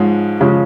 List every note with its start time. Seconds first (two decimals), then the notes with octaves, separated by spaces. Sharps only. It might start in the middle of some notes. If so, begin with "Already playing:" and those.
Already playing: G#2 F3 G#3 C#4
0.41 C#3 F3 G#3 C#4